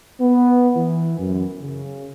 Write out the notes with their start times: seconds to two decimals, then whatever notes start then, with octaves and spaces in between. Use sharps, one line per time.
0.20 B3
0.76 E3
1.19 F#2
1.61 C#3